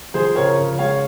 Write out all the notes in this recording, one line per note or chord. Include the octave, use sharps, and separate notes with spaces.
F3 G#4 C5
C#3 A#4 C#5
C#3
G#3 C#5 F5